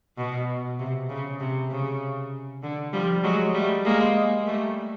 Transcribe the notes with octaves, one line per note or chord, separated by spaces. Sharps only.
B2
C3
C#3
C3
C#3
D3
F3 G3
F#3 G#3
G3 A3
G#3 A#3
G3 A3